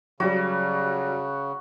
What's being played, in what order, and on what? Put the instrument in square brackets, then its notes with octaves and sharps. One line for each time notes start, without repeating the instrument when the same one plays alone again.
[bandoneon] C#3 [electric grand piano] F#3 G3 [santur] F#4